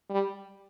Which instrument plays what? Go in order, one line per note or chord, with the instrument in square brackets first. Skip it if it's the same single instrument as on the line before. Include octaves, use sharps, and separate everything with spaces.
[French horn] G3